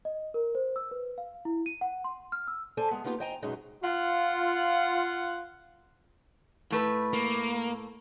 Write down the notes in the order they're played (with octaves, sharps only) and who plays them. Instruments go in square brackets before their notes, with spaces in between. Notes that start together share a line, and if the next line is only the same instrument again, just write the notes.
[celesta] D#5
A#4
C5
E6
B4
F5
E4
D#7
F#5
C6
F6
E6
[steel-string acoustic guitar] A4 C5 D5 G#5 A5
G#3 B3
A#3 B3 D#4 F4 G4
C5 D#5 G5 G#5 A#5
F#2 B2 G#3 C#4 D#4
[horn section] F4 F#5
[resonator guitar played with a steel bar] A2 A3 B4
[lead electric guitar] A#3